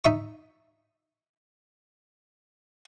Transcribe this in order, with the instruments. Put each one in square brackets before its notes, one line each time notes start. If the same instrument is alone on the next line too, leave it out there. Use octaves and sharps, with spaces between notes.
[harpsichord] D#4 E5 C#6